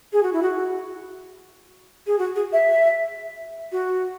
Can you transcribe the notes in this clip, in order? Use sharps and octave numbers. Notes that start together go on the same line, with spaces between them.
G#4
F#4
E4
F#4
G#4
F#4
G#4
E5
F#4